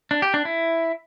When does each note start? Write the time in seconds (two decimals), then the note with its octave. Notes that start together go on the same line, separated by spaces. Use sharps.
0.11 D4
0.22 G4
0.34 D4
0.45 E4